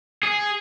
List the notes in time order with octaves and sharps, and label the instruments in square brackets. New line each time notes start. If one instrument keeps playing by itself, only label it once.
[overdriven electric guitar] G#4